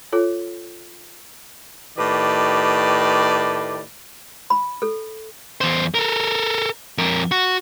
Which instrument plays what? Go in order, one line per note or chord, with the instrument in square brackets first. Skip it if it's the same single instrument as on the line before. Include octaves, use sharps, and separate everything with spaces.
[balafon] F4 A4 C#5
[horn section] A2 D#3 G4 B4 D5
[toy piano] B5
A4
[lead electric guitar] E2 C5
A4 A#4
F2 A#4
F#4